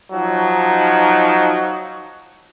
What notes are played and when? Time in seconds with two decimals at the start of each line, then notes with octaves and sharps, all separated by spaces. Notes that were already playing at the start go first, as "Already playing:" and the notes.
0.11 F3 F#3 D#4